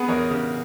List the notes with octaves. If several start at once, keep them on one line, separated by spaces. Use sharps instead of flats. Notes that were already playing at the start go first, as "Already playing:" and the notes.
Already playing: B3 G#4 B4
E2 A#4 C#5
C#3